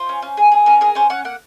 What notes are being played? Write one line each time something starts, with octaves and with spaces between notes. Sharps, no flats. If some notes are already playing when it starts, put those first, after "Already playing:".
Already playing: F4 C5
C#4
C#4
G#4
G#4
C#4 A#4
G#4 A#4
C#4 C5
C#4 F#5
A#3 F#5